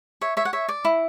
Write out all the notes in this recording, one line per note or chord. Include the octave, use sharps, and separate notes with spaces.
C#5 E5
C#5 E5
F#5
C#5 E5
D5
E4